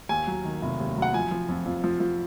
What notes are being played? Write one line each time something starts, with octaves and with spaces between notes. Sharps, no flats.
D#2 G#5
F#3
D#3
F1
D#2
F#3
F#5
F3 G#5
F3
F2
F2
F3
F3